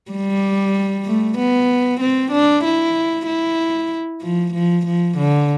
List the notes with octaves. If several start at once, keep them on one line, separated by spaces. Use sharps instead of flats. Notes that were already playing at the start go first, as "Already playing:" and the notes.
G3
A3
B3
C4
D4
E4
E4
F3
F3
F3
D3